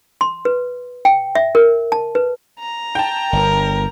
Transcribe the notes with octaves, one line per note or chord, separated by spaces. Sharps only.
C6
B4
G5
E5
A#4
A5
B4
A#5
G5 A5
G1 A#4